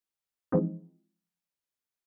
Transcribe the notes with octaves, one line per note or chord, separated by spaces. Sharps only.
E3 F3 G#3 C4 D#4